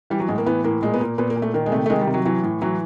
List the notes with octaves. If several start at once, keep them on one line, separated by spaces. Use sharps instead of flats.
E3 G3
F#3
A2 G#3
A#3
E3 B3
A2 A#3
A#2 G#3
B3
A#2 A#3
A#2 B3
A#3
A#2
A3
D#3 A#3
G#3
C3 A3
A3
D#3 G#3
G3
C3
F#3
E3 F#3
A2
E3 F#3